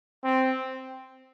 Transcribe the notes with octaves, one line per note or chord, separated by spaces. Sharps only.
C4